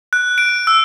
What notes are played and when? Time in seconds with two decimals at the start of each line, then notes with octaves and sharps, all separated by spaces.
0.13 F#6
0.38 D7
0.67 E6